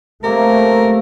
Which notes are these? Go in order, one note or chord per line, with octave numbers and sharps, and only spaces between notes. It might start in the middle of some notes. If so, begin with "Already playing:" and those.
C3 A3 A#3 A#4